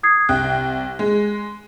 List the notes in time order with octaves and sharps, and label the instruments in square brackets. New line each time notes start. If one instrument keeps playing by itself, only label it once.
[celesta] D#6 G#6 C7
[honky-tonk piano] C2 G5 [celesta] F#6
[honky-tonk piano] G#3